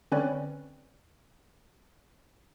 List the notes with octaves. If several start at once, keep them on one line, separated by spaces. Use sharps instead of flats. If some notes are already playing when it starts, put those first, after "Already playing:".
D3 C4 C#4 B4 C#5 D5